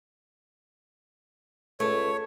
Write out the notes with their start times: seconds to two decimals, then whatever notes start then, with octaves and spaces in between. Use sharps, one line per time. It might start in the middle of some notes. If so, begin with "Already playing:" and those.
1.80 C#2 A3 C#5